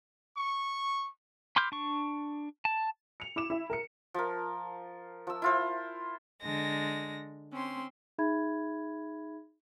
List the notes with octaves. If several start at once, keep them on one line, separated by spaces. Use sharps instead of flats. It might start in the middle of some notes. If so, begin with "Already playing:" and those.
C#6
B5 C6 D6 F6 G6
D4 C#6
A5
C#7 F7
E4 D6 E7
E4 E5
A#4 C#7
F3 A#4
F3 E6
E4 F4 C5
D3 G#3 A#6
C4 C#4 C6
D#4 G#4 E5 B5 G#6